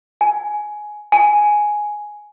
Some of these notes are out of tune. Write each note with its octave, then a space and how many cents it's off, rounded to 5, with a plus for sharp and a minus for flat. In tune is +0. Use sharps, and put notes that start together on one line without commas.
G#5 +15
G#5 +5